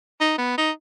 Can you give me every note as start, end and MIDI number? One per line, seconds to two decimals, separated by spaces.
0.21 0.34 63
0.38 0.54 59
0.58 0.71 63